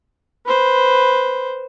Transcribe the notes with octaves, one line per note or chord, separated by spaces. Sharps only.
B4 C5